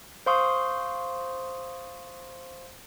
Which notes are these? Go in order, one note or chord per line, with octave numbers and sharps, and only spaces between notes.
C5 F5 C6 C#6 D#6